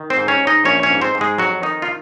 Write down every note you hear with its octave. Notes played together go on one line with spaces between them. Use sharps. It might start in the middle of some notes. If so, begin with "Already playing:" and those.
Already playing: D#3
C4 C5
G#2
C#4 C#5
G#2
D#4 D#5
A#1 C#4 C#5
C#4 C#5
G#2
C4 C5
G#2
G#3 G#4
F2 F#3 F#4
D#3 D#4
F4